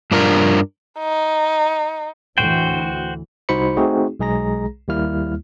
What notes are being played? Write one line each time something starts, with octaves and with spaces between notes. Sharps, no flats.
G2 D4 F4 A#4
D#4
D2 A2 E3 F#4 C5 G5
C2 D#4 F#4 C5 B5 C#7
A3 C4 D#4 F#4 G#4
B1 G#3 G#4 A#5 A#6
D#2 G3 A#3 E4 F6